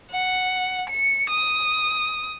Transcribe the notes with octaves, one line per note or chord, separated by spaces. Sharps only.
F#5
C#7
D#6